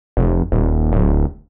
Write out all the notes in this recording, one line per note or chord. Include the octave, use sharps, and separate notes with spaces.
F1
D#1
D1